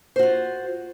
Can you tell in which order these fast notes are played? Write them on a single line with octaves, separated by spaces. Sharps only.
C5 F#4 F4